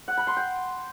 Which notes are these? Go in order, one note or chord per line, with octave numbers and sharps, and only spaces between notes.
F#5
B5
C6
G5